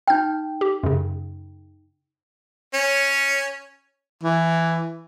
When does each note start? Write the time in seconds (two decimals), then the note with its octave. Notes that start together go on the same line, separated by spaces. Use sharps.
0.08 D#4 G5 F6 G6
0.61 G4
0.83 F#2 C#3
2.74 C#4 C#5
4.24 E3